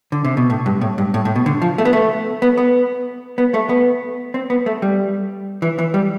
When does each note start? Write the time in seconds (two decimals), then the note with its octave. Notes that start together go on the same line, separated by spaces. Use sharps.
0.12 D3
0.25 C3
0.37 B2
0.50 A2
0.66 G2
0.81 A2
0.98 G2
1.14 A2
1.25 A2
1.36 B2
1.46 D3
1.62 F3
1.78 A3
1.85 B3
1.93 A3
2.42 B3
2.57 B3
3.38 B3
3.54 A3
3.69 B3
4.34 C4
4.50 B3
4.66 A3
4.82 G3
5.62 E3
5.79 E3
5.94 G3